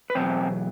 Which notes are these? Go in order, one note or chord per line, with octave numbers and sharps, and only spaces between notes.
B4
E2 B2 F#3 C4 C5